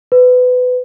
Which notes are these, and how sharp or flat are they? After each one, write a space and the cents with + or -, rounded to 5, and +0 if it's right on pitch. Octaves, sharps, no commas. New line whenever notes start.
B4 +20